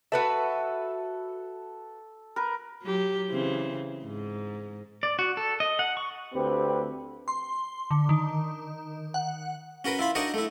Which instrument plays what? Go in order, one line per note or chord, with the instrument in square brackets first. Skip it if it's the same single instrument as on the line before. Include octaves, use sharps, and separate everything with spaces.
[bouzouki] F#4 B4 E5 [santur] A4
[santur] A#4 B4
[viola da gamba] F#3 G4
C#3 E3 C4
G#2
[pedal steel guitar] D5
F#4
A4
D#5
F#5
C#6
[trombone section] D2 C4 G4 B4
[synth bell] C6
D3
D#3
F#5
[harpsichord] C#4 F#4 A#4 B4
E4 F4 B5
D4 D#4 F#4 A#4 C#5 D#5
A3 E4